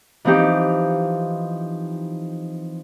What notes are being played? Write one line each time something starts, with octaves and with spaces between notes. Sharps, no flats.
E3 F3 C4 D#4 G4